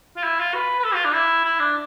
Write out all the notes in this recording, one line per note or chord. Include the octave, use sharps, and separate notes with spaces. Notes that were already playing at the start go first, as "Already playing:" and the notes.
F4
E4
F4
B4
B4
A4
F4
D4
E4
E4
D4